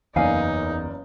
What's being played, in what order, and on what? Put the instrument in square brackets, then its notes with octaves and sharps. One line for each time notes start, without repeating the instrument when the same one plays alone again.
[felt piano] F#1 A#3 D5 [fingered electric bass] E2 [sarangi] D#4 [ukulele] B4 F5 G#5